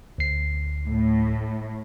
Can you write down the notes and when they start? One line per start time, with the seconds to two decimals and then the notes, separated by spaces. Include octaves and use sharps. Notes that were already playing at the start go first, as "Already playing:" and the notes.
0.18 D2 C7
0.87 A2